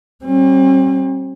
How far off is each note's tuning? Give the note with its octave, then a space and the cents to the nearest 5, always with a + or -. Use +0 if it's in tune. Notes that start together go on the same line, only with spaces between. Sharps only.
G3 -35 C4 +45